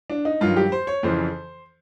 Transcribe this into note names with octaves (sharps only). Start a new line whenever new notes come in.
D4
D#4
G2 D#3 F#3 F4
G4
C5
C#5
F2 C#3 E3 C5